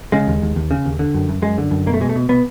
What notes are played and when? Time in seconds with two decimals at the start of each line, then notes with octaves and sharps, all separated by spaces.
0.12 C#3 G#3
0.27 D#2
0.42 D#2
0.56 D#2
0.71 C#3
0.85 D#2
0.99 D3
1.14 F#2
1.29 F#2
1.42 F#2 G#3
1.58 D3
1.71 F#2
1.86 B2 A#3
1.94 A3
2.00 B2 G#3
2.09 A3
2.16 B2
2.29 B2 B3